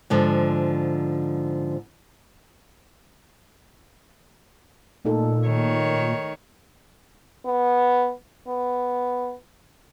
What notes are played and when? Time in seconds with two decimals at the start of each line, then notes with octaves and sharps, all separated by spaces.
0.10 G#2 D3 F3
5.05 A#2 A3 D#4 A4
5.47 D#3 C#5
7.45 B3
8.48 B3